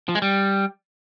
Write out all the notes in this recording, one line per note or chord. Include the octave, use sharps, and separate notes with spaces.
F3
G#3
G3